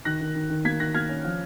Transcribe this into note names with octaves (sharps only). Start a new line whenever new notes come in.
D#3 F#6 A#6
D#3
D#3
D#3
A#3 G#6 B6
D#3 F#6 A#6
A#3 F6 G#6
C#4
F3